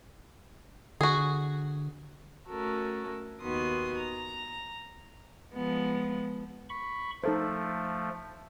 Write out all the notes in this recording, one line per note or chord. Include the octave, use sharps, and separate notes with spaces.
D3 F#4 G#4
A3 C#4 F#4 A4 A#4
D#2 D#3 B3 F#4 C6 D#6
A#5
F3 G#3 B3
B5 C#6
F3 A3 D#4 A4 C5